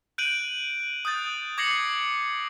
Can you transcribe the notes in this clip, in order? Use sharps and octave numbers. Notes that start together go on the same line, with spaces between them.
F#6 G6 D7 D#7 F#7
D#6 F#6 G6 A6
D6 G#6 A#6 C7 C#7 F#7